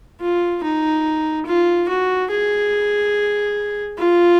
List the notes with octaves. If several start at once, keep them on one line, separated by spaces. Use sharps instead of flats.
F4
D#4
F4
F#4
G#4
F4